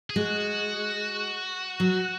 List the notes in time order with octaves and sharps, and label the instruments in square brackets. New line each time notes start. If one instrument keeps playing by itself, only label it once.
[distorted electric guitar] G#4
[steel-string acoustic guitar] G#3 [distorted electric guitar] F#4
[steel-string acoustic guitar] F#3